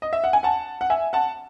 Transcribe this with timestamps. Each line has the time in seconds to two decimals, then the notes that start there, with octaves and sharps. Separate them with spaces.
0.02 D#5
0.13 E5
0.24 F#5
0.33 G#5
0.43 F#5 A5
0.81 F#5
0.90 E5 G#5
1.13 F#5 A5